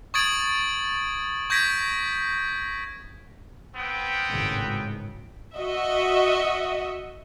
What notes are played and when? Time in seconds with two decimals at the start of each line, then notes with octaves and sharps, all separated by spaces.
0.14 C#6 D#6 G#6 A6 D7 F#7
1.50 C#6 G6 G#6 A#6 B6 D7
3.75 B3 C4 G5
4.29 G#1 A2 C#3
5.54 F#4 D#5 E5